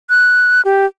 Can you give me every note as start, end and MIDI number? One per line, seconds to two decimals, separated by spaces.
0.10 0.61 90
0.65 0.86 67